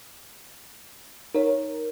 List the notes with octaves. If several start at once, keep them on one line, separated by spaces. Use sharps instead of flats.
D#4 A#4 C#5